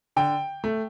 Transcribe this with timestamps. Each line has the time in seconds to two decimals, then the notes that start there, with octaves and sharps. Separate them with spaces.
0.16 D3 G5
0.64 A3